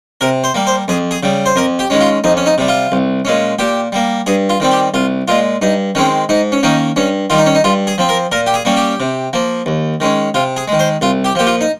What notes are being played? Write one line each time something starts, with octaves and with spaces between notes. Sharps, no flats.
C3 A#4
C5
G3 A#3
C5
F2 G#4
G#4
C#3 G3
C5
F2 A#4
G4
D#3 G#3 C#4
F4
F2 D#4
C#4
D#4
C3 G3
F4
C2
A#2 G#3 C#4
A#2 G4
G3 A#3
G2 G#4
F4
D#3 G3 C4
G4
C2 F4
A#2 G#3 F4
G2 D#4
D#3 G#3 C4 C#4
G#2 D#4
C#4
D#3 A#3 C#4 D#4
G2 C#4
D#3 G3 F4
D#4
C#4
D#4
G2 F4
G#4
F3 C4
A#4
A#2 A#4
G4
G#4
G3 A#3 C#4
G4
C3
F3 A#3
D#2
D#3 G#3 C#4
C3 F4
G#4
D#3 G#3
C5
C2 F4
G4
A#2 F3 G4
F4
D#4